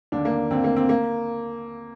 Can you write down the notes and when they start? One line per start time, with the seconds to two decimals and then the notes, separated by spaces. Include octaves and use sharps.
0.12 D#2 D3 D4
0.25 A#3
0.50 D#2 D3 C4
0.64 A#3
0.76 C4
0.89 A#3